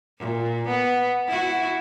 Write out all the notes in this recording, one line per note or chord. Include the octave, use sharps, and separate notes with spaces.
A#2
B3
E4 F#4